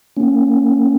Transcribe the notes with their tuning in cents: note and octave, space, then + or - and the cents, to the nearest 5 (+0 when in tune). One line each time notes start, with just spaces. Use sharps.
A#3 -20 C#4 +0